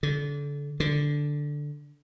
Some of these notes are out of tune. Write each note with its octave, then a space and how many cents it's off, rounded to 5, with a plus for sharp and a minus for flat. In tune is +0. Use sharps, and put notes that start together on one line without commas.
D3 -30
D3 +0